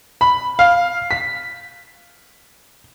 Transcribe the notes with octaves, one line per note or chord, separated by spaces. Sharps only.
B5
F5
B6